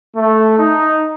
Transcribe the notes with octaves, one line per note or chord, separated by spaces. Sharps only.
A3
D#4